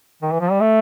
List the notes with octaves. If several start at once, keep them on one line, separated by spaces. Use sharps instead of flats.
D#3
E3
F3
G3
A3